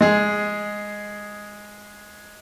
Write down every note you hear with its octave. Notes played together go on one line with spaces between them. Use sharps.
G#3 G#4